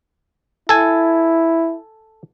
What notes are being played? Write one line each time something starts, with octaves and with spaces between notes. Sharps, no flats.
E4 A4 G#5